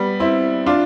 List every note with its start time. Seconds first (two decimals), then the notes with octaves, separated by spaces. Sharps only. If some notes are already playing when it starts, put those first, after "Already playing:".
Already playing: G3 B3
0.20 C4 E4
0.66 D4 F4